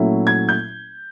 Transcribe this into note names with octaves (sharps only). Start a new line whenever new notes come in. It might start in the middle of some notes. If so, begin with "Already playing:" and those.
Already playing: A#2 F#3 A3 C#4 E4
G#6
G6